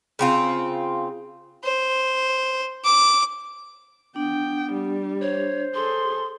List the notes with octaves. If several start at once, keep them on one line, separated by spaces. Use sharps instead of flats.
C#3 C4 F4
C5
D6
B3 D4 G5
G3
C5 C#5
G#4 A4 C6